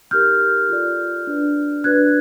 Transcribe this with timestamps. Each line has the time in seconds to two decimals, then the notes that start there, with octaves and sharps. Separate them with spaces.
0.11 D#4 G4 A#4 F6 G6
0.69 F4 A4 D5
1.27 D4 F#4 B4 D5
1.84 D4 F#4 B4 D5 F#6 G#6